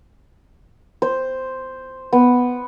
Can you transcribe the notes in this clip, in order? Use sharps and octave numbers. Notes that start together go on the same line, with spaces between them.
C5
B3